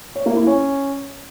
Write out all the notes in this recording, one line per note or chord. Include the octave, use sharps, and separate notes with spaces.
C#5
A#3
E4
C#4